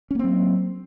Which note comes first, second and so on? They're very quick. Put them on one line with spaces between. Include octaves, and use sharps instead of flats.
C#4 A#3 C4 F#3